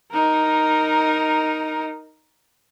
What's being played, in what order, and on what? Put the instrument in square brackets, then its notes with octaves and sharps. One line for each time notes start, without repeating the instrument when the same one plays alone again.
[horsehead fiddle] D#4 A#4